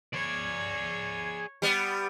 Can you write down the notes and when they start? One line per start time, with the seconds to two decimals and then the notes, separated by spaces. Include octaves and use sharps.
0.14 G#4 C#5 D5
1.62 G3 B3